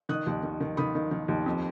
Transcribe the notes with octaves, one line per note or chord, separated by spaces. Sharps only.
D#3 D#6 F#6
D#2
D#3
D#3
D#3 B5 D#6
D#3
D#3
D#2
F2